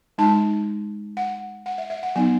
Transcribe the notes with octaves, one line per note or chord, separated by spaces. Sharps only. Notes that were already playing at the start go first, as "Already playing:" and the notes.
G#3 D#4 A5
F#5
F#5
E5
E5
F#5
F#3 B3 D#4 G#5